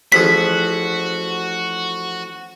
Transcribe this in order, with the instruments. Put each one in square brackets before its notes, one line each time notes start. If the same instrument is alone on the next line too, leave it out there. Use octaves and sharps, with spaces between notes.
[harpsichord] A1 F3 G#4 [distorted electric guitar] F#4 [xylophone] B6